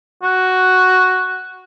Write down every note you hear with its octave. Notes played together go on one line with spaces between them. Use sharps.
F#4